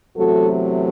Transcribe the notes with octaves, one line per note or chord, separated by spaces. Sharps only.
E2 C3 F#3 A3 F#4 A4